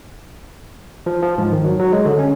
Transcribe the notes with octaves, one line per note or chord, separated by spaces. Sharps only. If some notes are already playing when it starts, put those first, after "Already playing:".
F3
F3
G#2
D#3
F#3
F#3
G#3
D3
C#4